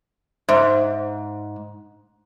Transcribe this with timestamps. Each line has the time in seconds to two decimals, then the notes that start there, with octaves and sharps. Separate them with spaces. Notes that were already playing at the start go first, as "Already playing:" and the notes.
0.49 G#2 C5 E5